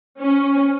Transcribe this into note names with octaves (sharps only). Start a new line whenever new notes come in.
C#4